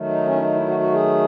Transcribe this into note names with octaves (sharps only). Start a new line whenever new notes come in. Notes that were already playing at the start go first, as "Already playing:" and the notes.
Already playing: D#3 F#3 A3
D#4
C#4
E4
D#4
E4
F#4
F#4
G#4